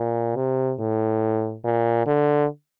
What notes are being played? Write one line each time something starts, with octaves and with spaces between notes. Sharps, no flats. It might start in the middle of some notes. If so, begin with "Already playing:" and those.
Already playing: A#2
C3
A2
A#2
D3